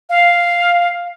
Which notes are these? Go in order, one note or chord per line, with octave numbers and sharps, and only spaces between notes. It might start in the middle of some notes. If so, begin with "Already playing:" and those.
F5